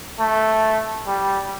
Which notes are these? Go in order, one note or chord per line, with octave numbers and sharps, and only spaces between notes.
A3
G3